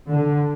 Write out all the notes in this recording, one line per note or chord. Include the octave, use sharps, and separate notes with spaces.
D3